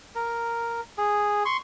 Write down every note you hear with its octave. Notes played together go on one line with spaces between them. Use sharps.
A#4
G#4
C6 C#6